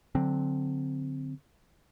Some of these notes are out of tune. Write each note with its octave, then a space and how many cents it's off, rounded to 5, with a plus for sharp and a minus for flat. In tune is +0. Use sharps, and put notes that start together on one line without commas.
D3 +0 F#3 -10 C4 +0